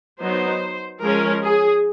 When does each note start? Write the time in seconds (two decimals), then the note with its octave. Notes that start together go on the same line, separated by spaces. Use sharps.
0.21 F#3 B3 D#4 C5
1.02 F3 G#3 C#4 A#4
1.42 G#4